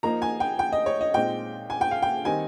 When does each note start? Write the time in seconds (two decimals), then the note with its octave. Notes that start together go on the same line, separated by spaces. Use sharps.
0.03 F3 A#3 D#4 A#5
0.22 G#5
0.40 G5
0.59 G5
0.72 D#5
0.86 C#5
1.01 D#5
1.14 A#2 G#3 C4 D#4 G5
1.70 G#5
1.81 G5
1.91 F5
2.02 G5
2.25 D#3 G3 C4 D#4 G#5